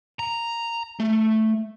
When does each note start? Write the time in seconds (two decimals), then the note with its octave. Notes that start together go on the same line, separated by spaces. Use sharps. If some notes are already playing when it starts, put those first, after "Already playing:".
0.19 A#5
1.00 A3